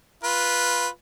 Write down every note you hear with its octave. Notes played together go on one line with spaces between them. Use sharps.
F4 B4